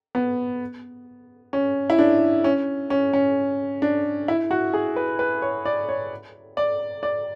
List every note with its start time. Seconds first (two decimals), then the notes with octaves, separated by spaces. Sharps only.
0.15 B3
1.53 C#4
1.90 E4
1.99 D4
2.44 C#4
2.90 C#4
3.13 C#4
3.82 D4
4.28 E4
4.51 F#4
4.73 G#4
4.96 B4
5.19 B4
5.42 C#5
5.65 D5
5.89 C#5
6.57 D5
7.03 D5